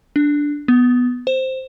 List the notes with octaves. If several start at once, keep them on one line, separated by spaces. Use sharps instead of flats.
D4
B3
C5